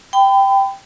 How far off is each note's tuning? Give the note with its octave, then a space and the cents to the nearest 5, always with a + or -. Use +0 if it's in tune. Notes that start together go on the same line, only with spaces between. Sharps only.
G5 +0 B5 +35